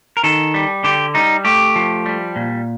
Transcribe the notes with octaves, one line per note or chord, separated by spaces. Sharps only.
A#4
D#3 A4
G3
D3 G4
G3 D#4
A3 G4
F3
G3
A#2